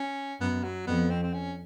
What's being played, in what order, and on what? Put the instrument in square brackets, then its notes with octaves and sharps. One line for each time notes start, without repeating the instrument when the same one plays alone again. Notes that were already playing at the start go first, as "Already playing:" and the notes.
Already playing: [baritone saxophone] C#4
[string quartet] F#2 [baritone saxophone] B3
[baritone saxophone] F#3
[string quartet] F2 [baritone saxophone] B3
[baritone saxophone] C4
C4
C#4